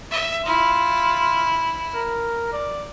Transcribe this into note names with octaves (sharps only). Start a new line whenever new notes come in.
E5
E4 F4
A#4
D5